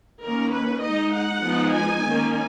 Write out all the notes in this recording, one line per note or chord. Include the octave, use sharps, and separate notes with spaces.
D#3 A#3 C#4 A#4
B4
G#3 D#4 D#5
F#5
F3 G#3 B3 D#4
G#5
D#3 A#3 C#4